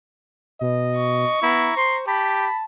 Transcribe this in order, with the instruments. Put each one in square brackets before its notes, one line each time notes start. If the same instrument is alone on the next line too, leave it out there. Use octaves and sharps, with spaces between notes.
[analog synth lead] B2 [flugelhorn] D#5
[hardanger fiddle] C#6
[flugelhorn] B3 [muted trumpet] E4 [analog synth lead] A#5
[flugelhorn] C5 [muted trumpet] C6
[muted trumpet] G4 [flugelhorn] A5 [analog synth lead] B5